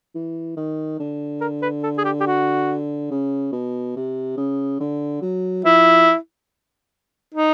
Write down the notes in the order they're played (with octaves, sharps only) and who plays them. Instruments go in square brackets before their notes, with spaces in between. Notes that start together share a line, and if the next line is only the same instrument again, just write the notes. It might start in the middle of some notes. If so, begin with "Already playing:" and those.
[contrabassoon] E3
D#3
D3
[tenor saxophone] A#4
B4
A4
G#4
G4
G4
F#4
[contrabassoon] C#3
B2
C3
C#3
D3
F#3
[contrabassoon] F3 [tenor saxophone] E4
[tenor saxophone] D#4